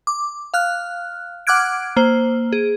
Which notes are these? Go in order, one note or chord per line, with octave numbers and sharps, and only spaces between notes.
D6
F5 F6 F#6
F#5 D6 F6 F#6 G#6 D7
A#3 C5
G#4